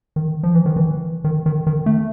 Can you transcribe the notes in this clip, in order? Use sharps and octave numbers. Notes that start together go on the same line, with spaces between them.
D#3
F3
E3
D#3
E3
D#3
D#3
D#3
A3